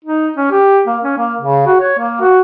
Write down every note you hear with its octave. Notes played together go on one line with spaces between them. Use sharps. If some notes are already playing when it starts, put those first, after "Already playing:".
D#4
C#4
G4
A#3
C#4
A#3
C#3
F#4
C#5
A#3
F#4